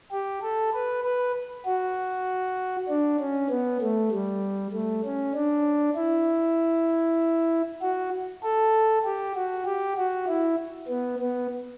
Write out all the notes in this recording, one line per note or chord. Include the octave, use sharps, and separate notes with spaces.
G4
A4
B4
B4
F#4
D4
C#4
B3
A3
G3
A3
C#4
D4
E4
F#4
A4
G4
F#4
G4
F#4
E4
B3
B3